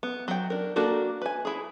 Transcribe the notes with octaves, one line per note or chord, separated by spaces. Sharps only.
B3
F#3 G5
D4 A#4
A#3 D4 F#4 A4 A#4
B4 G#5
E4 G#4